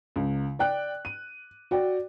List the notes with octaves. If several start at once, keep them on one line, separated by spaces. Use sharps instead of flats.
C#2
D5 G5 F#6
D#7
F#4 D5 G5